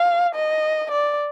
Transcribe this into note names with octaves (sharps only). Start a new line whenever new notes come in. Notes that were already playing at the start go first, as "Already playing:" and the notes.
Already playing: F5
D#5
D5